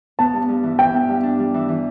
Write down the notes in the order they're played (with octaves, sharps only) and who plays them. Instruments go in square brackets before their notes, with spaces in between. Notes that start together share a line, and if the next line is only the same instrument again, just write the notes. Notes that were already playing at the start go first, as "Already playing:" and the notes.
[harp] B3 [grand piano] A5
[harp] G2
G2
E3
[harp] E3 [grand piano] G5
[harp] B3
G2
D4
G3
E3
E3